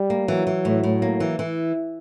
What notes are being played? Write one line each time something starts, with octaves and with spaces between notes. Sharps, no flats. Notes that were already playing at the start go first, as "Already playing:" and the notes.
Already playing: G3
A#3
E3 F#3
E3
A2
A2
A#3
E3
E3